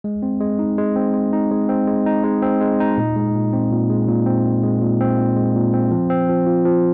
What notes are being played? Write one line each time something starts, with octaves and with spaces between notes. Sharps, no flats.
G#3
C4
G#3
D#4
G#3
C4
G#3
D#4
G#3
C4
G#3
D#4
G#3
C4
G#3
D#4
A#2
G#3
A#2
C4
A#2
G#3
A#2
C4
A#2
G#3
A#2
C4
A#2
G#3
A#2
C4
F3
C4
F3
F4
F3